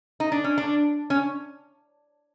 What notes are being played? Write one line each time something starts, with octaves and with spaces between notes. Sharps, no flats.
D#4
D4
C#4
D4
C#4